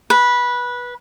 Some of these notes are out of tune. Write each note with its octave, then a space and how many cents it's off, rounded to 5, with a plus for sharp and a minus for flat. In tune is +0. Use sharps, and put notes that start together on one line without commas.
B4 -15